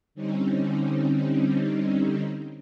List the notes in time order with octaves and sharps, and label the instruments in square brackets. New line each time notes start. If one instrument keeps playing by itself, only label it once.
[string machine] D3 G3 C4 C#4 D#4